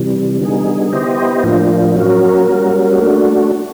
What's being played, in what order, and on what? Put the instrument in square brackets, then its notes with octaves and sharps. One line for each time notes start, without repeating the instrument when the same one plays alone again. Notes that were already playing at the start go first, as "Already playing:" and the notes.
Already playing: [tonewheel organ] C3 E3 G3
D3 G3 B3 D#4 G#4
B3 E4 G4 C5 D#5
A2 F3 A#3 D4 F4
F#3 A#3 C#4 F#4 A#4
G3 A#3 C#4 F#4 A#4
A3 D4 F#4